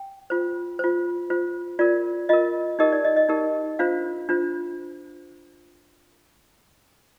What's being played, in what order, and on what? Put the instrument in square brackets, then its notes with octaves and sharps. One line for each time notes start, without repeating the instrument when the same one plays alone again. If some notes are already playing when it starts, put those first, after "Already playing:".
Already playing: [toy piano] G5
F4 C5
F4 C5
F4 C5
F4 A#4 D5
F4 A#4 D#5
D#4 G4 A#4 D#5
D5
D#5
D#5
D#4 G4 A#4
D4 F4 C5 F5
D4 F4 C5